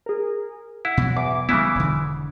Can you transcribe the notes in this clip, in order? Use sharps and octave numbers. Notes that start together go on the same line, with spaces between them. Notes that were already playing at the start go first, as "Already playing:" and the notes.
G#4 A#4
E4 F#5
B2 F#3
E2 D6
C#3 E3 G3 B3 E4
E1 D3